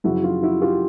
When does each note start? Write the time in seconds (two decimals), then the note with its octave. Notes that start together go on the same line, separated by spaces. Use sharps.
0.04 F#2 C#3 F3 E4 F#4
0.24 F4
0.43 E4 F#4
0.62 F4 G4